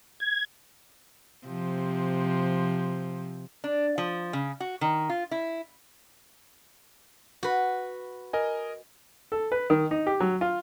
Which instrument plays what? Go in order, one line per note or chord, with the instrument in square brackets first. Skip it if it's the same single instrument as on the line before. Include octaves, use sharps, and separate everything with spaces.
[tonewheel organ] G#6
[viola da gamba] C3 F3
[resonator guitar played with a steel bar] D4
F3
C#3
F#4
D#3
F4
E4
[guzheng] F#4 B4
[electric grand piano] A#4 D#5 G#5
[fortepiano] A4
B4
D#3
D#4
G4
F#3
F4